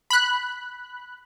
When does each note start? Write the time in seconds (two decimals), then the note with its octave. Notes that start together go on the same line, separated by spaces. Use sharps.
0.10 B5 F#6